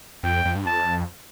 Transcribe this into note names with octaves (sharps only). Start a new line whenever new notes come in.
F2 G5
F2
G2
F2 A5